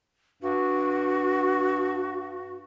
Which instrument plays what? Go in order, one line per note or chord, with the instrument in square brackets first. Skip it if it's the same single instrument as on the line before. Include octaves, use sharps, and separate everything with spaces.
[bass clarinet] G2 [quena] F#4